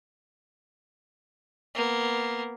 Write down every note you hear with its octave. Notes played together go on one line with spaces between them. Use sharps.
A#3 B3